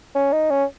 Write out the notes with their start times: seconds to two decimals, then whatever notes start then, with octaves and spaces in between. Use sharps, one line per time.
0.15 C#4
0.33 D#4
0.50 C#4